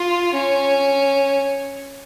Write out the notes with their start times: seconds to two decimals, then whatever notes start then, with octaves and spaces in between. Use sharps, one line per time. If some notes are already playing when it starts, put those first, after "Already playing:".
Already playing: F4
0.33 C#4